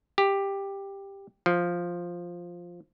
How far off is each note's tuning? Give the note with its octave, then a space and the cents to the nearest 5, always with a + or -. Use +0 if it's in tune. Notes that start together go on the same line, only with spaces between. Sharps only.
G4 +10
F3 +0